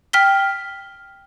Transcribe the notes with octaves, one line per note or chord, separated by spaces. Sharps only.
G5 F6 B6 G7